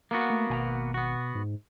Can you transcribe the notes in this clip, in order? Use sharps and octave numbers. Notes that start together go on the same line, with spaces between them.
A#3 B3 F#4
A3
G#1 B2 G#5 A#5
B3 F#4
G#2